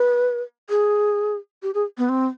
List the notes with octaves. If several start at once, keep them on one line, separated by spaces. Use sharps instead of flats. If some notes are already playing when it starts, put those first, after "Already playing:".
Already playing: B4
G#4
G4
G#4
B3
C4